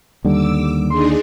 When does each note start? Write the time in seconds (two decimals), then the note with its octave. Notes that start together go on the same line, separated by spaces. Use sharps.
0.25 D#2 D3 G3 D6 E6
0.90 D4 D#4 G#4 C6